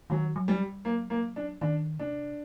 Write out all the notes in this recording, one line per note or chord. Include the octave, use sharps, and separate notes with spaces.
D#3 F#3
F#3
G3
G3
F#3 A#3
A#3
D4
D#3 D4
C3 D4